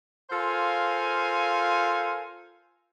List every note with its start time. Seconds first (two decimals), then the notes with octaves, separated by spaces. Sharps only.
0.30 F4 A4 A#4 C5 F5 G#5